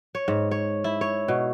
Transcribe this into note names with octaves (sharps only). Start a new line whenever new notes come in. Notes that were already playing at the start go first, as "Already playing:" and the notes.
C#5
G#2
C#5
E4
C#5
B2